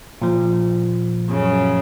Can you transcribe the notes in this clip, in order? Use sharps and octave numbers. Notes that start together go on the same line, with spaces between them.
A#2 F3
F#2 C#3